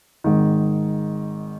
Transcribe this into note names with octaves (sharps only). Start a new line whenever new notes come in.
G#1 G#2 D#3